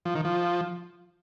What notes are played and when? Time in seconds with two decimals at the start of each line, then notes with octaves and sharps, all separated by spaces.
0.05 F3
0.15 D#3
0.25 F3